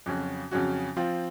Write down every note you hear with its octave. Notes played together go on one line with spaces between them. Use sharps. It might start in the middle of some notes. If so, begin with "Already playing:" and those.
F2 C#3 F#3 C#4 F#4
F2 C#3 F#3 C#4 F#4
F3 C4 F4